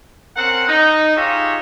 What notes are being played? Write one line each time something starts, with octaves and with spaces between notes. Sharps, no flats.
C4 C#4 A#4 F#5
D#4
D#4 F4 G4 G#4 C#5 E5